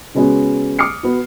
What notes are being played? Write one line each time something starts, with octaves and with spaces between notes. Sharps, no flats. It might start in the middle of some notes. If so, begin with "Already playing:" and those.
C#3 G#3 B3 C#4 F#4 G#4
D6 D#6 F6 C7 C#7
B3 F#4